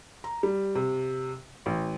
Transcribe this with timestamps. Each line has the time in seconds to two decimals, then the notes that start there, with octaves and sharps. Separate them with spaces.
0.24 A#5
0.43 G3
0.75 C3
1.66 A1